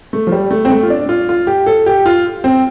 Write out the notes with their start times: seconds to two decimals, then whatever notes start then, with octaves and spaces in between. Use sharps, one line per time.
0.13 A3
0.27 F3
0.32 G3
0.51 A3
0.65 C4
0.70 A3
0.83 F4
0.90 D4
1.09 F4
1.29 F4
1.47 G4
1.66 A4
1.86 G4
2.06 F4
2.44 C4